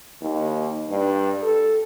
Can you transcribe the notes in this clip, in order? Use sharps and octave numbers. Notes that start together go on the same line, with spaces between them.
D#2
G2
A4